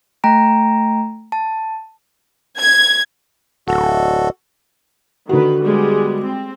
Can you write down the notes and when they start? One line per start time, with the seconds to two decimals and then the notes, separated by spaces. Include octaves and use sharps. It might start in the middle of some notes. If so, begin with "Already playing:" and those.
0.24 A3 G5 A#5 A#6 D7
1.32 A5
2.58 G#6
3.68 D1 F#4 A4
5.29 D3 D#3 F#4 B4
5.63 G3 G#3 B3
6.22 C4